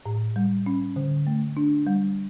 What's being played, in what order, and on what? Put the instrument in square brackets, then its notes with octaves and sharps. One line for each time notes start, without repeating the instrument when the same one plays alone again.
[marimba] A2
G3
C#4
D3
A3
D4
G3